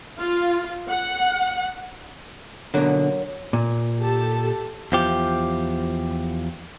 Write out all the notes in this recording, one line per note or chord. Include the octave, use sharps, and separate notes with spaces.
F4
F#5
B2 D3 F#3 A#3
A#2
G4 A4 A5
E2 F3 G4